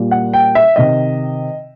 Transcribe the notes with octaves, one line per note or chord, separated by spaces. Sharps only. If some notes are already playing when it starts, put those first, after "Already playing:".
Already playing: A#2 G3 A#3
F#5
G5
E5
C3 D#3 D#5